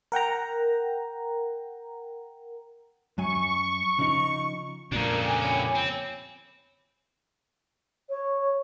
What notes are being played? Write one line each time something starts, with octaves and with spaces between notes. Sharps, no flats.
A#4 F#5 G5 A#5
F#2 F#3 G#5 C#6
C#3 F3 D#4
F2 A#2 C#3 D4 A#4 D5
G4 G#5
C#5 B5
C4
C#5